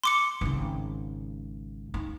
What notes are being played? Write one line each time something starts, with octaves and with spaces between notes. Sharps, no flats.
C6 D6 C#7
G#1 C#3
D#4